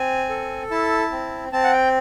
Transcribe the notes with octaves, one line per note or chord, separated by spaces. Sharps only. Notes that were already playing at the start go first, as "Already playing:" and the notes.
Already playing: C4 G#5
A4
E4 A5
C4
C4 A5
F#5
G5